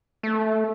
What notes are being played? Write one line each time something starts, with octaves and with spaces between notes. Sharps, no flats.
A3